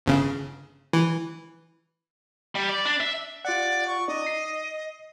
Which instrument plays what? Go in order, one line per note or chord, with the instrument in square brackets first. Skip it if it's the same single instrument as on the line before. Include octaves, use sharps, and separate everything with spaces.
[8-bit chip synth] G1 C#3
E3
[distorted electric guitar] G3
D5
D4
E5
[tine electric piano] F4 F#5 [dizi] D5
[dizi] C#6
[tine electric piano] D#4 D5 [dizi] D#5
[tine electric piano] C7